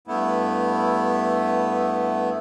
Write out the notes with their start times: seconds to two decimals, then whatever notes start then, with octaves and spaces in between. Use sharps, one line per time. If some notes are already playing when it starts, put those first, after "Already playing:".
0.08 G2 A3 B3 E4